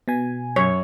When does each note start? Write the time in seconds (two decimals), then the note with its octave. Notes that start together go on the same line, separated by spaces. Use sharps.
0.08 B2 G#5
0.56 F#2 C#5